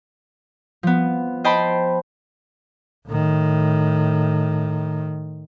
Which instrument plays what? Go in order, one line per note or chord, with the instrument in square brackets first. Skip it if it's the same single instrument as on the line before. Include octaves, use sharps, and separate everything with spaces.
[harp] F3 B3
C5 D#5 G5 A5 B5 C6
[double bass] A2 D#3